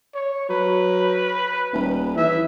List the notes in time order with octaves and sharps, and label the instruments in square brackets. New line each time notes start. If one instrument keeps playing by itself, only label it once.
[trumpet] C#5
[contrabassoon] F#3 [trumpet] B4
[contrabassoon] D#1
[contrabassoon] E3 [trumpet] E5